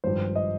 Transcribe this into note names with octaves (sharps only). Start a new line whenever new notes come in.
G#1 G2 F3 C5
D#5